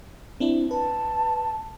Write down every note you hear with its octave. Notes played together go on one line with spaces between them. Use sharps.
C4 D4 E4
B4 A5